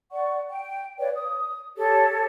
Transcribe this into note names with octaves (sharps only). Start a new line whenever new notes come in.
D5 F#5 C#6
G5
B4 C#5 D5 F5
D#6
G4 A4 C#5